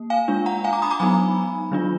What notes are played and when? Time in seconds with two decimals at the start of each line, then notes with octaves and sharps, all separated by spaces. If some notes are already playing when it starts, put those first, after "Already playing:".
Already playing: A#3
0.10 F5 G#5
0.28 G#3 D4 F4
0.46 F#5 A#5
0.64 F5 G#5
0.73 A#5 D6
0.82 B5 D#6
0.91 A#5 D6
0.99 F#3 B3 D#4 G#5 B5
1.71 D#3 F#3 D4 F4